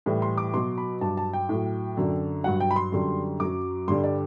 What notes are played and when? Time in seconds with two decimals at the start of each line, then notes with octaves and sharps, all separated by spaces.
0.06 A2 E3 G3
0.22 C6
0.38 D6
0.54 B2 F#3 C6
0.78 B5
1.01 G2 F#3 A5
1.17 A5
1.33 G5
1.49 A2 F#3
1.97 F#2 D3 F#3
2.44 G2 F#3 F#5
2.60 G5
2.71 B5
2.76 C6
2.92 F#2 D3 G3
3.40 F#2 F#3 D6
3.88 G2 D3 G3 C6
4.04 D5